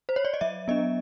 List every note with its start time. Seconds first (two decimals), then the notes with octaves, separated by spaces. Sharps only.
0.09 C5
0.16 C#5
0.25 D5
0.34 D#5
0.41 F#3 E5
0.68 B3 D4 D#5